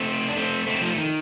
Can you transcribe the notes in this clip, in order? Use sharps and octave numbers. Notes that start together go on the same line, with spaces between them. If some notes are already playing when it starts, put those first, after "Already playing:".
Already playing: A3 C4
D4
A3 C4
A3 C4
F3 A3
D#3